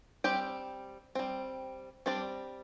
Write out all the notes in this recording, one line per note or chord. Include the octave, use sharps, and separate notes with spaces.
G3 C4 G4 G5
G3 C4
G3 C4 D4 D5